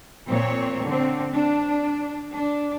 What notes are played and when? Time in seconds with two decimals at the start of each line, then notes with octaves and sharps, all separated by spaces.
0.27 A#2 C4 C#5
0.86 D3 C4
1.33 D4
2.34 D4